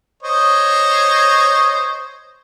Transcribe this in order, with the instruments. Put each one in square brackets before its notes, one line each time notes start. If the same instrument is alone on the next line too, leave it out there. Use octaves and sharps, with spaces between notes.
[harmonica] C5 C#5 D#5